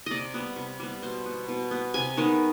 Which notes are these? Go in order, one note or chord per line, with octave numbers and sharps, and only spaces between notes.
C3 D5 D#5
G3 B3
C3
G3 B3
B2 C5
B3
B2
B3
C3 G#5
D#3 G#3 B3